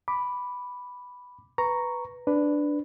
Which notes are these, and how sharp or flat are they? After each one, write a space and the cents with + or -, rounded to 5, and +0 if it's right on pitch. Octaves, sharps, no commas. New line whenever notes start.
B5 +0 D6 +0
B4 +0 A#5 +0 C#6 +0
D4 +0 B4 +10